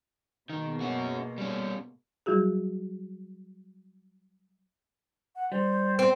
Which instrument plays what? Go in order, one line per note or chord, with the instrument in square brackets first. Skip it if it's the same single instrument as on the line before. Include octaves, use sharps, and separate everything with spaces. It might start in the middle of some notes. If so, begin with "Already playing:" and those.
[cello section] B2 G#3 A#3 [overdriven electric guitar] D#3
[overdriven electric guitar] C#4 F#4
G3 C#4
[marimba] F#3 G3 E4 F#4 G#4
[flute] F#5
[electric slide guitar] G3 [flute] C5
[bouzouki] C4 [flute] C5